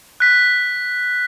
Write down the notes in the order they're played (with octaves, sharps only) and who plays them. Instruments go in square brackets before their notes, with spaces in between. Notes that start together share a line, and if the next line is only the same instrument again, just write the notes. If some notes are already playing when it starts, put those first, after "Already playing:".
[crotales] F#6 B6